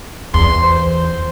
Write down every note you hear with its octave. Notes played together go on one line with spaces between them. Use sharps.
E2 C6
C5